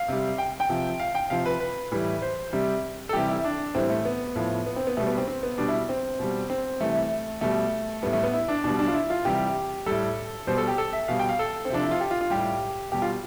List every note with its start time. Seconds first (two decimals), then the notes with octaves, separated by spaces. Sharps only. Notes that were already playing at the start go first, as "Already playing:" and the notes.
Already playing: F5
0.08 C3 G3
0.38 G5
0.60 G5
0.69 C3 F3
0.99 F5
1.15 G5
1.30 C3 F3 F5
1.45 B4
1.60 B4
1.91 A2 E3 G3
2.22 C5
2.53 C3 G3
3.09 A4
3.13 C3 E3 G3 G4
3.29 E4
3.44 D4
3.74 A2 E3 G3 C4
3.90 A3
4.05 B3
4.35 A2 F3
4.66 B3
4.76 C4
4.87 B3
4.97 B2 G3 A3
5.07 B3
5.17 C4
5.28 C4
5.43 B3
5.58 B2 G3 D4
5.68 E4
5.89 C4
6.19 B2 G3
6.50 C4
6.80 C3 E3 G3 A3
7.41 B2 G3 A3
8.03 A2 G3 B3
8.13 A3
8.23 B3
8.33 E4
8.48 D4
8.64 B2 G3 D4
8.79 D4
8.88 F4
8.94 E4
9.10 F4
9.25 C3 E3 G3 G4
9.86 A2 G3 A4
10.47 B2 G3 C5
10.58 A4
10.68 G4
10.78 A4
10.93 E5
11.08 B2 G3 F5
11.19 G5
11.29 F5
11.39 A4
11.65 C4
11.70 C3 F3 D4
11.83 E4
11.91 F4
12.00 G4
12.11 F4
12.21 F4
12.30 A2 G3 G4
12.92 B2 G3 G4
13.02 F4